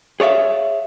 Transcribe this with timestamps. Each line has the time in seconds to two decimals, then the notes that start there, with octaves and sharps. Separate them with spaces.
0.20 G#4 C#5 D5 E5 F5